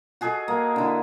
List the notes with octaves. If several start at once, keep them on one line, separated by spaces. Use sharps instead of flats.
F#4 G#4 A4 D#5
A#3
D3 E4